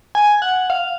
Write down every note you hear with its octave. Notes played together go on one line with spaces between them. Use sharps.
G#5
F#5
F5